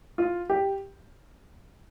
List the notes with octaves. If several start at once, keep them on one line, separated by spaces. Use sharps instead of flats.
F4
G4